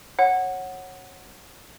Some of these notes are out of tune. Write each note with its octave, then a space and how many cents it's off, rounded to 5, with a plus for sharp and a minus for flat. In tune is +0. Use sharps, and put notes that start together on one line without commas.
C#5 -20 F#5 +0